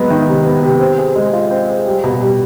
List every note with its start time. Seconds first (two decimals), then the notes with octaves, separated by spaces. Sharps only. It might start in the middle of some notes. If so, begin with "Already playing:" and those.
Already playing: F#3 G#3 B3
0.10 D#3
0.28 C3
0.45 B3
0.63 C3
0.80 C4
0.98 G#4
1.16 G#3
1.33 F4
1.51 C4
1.68 G#4
1.86 G3
2.04 B2
2.21 G3